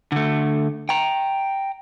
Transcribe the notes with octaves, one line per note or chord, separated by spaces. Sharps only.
D3 A3
G5 A#5